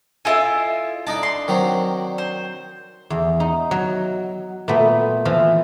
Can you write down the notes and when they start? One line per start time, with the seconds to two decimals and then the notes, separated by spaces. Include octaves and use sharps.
0.25 E4 F4 A4 D#5 E5 G#5
1.07 D4 D#4 D#5 A5
1.23 C6
1.48 D#3 F#3 C4
2.18 C5
3.10 E2
3.40 D#4
3.71 F#3
4.68 A#2 A3 B3
5.25 E3 F3 F4